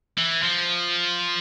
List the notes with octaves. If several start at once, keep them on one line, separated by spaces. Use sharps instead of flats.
E3
F3